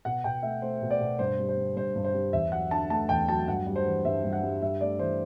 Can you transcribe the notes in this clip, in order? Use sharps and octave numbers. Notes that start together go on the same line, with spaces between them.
B2 F#5
B2 G5
A3 E5
A3 C5
B2
D5
B2
G2 C5
G3
C5
D3
G2 C5
G2
C5
G3
E2 E5
F#3 F#5
D3 A5
A3 A5
E2 G5
F#3 A5
G2 F#5
G3
C5
E3
G2 E5
G2
F#5
G3
G2 E5
A3 D5
E3 C5